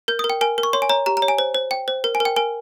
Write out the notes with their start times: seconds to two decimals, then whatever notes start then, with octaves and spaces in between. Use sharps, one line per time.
0.08 A#4 G6
0.19 D#6
0.24 A#4
0.30 G5
0.41 A#4 G#5
0.58 A#4
0.63 C#6
0.73 C#5 C6
0.82 G#5
0.89 C#5 A#5
1.06 G4 A#5
1.17 A#5
1.22 C#5
1.28 G#5
1.38 C5
1.55 C5
1.71 G5
1.88 C5
2.04 A#4
2.15 G#5
2.20 A#4
2.25 G5
2.36 A#4 G#5